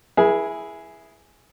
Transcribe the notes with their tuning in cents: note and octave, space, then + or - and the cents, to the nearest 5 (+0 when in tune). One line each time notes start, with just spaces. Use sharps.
E4 +0 G#4 +0 B4 -45